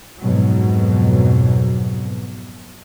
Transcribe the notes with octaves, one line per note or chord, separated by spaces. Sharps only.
F2 G#2 B2 F#3